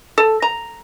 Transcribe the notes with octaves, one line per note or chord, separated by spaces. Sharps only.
A4
A#5